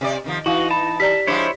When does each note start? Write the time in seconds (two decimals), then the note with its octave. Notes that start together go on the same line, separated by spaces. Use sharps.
0.01 C3 B4 D5
0.24 C3 D#3 F3
0.46 E3 D#4 E4 F#4 F5
0.71 A5 B5
1.00 G4 D5 A#5 B6
1.27 F3 G#3 D4 E4 C5 C#5